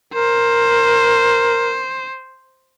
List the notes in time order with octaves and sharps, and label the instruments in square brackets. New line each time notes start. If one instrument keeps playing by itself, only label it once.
[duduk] A#4 [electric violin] C5